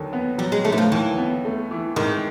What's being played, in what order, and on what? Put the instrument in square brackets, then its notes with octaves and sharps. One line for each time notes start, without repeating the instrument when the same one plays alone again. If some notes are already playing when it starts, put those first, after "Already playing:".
Already playing: [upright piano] D#2 D3 F#3
B3
[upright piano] F#3 [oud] G3
[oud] G#3
[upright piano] D3 [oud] A3
[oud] E3
F3
[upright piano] D#2 [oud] E3
[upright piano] B3
A3
E3
[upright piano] G#2 [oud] D#3